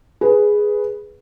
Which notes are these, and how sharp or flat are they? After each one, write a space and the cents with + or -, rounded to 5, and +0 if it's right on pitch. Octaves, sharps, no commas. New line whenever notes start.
G#4 +0 B4 +0